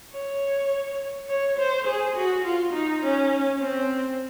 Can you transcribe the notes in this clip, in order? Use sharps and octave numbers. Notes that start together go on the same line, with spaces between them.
C#5
C#5
C5
G#4
F#4
F4
D#4
C#4
C4